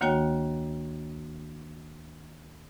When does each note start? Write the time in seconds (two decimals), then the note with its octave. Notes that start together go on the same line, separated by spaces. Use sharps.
0.01 D2 D#3 A#3 F#4 C#5 G5